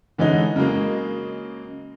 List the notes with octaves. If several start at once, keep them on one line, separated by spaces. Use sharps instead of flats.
D3 E3 G#3 C#4 D#4
C#3 F#3 G#3 A#3